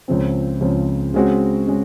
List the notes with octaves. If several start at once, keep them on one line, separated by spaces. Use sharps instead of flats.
C#2 C#3 F3 C4
C#2 C#3 F3 C4
C#3 G#3 C4 F#4
C#3 G#3